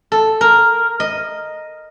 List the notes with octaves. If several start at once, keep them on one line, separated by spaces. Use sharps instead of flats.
A4
A#4
D#5